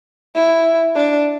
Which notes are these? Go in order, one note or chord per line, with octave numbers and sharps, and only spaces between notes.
E4
D4